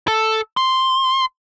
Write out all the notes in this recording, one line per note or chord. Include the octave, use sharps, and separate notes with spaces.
A4
C6